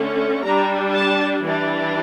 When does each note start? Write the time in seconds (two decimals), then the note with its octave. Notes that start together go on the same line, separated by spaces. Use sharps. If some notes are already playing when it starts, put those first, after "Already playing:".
Already playing: D3 A3 C#4
0.44 G3 D4 A#5
0.93 A5
1.42 E3 G3 D4